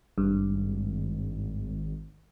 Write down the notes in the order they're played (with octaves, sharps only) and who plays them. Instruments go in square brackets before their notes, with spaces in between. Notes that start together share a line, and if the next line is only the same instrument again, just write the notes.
[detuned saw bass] G#1 [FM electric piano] G2